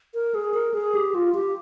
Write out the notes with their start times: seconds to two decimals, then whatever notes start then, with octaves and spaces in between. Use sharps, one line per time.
0.14 A#4
0.35 G#4
0.54 A#4
0.74 G#4
0.95 G4
1.15 F4
1.35 G4